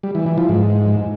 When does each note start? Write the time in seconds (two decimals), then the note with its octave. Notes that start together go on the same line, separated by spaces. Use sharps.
0.03 G3
0.15 E3
0.26 E3
0.38 F3
0.49 G#2